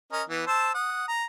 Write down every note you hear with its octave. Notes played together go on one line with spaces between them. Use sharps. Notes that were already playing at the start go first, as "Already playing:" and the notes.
C#4 A#4 D#5
E3 B3
C5 A5 E6
F#5 D#6
A#5